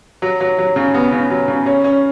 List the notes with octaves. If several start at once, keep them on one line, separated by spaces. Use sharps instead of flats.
F#3
F#3
F#3
C#3
B3
C#3
F#3
C#3
C#4
C#4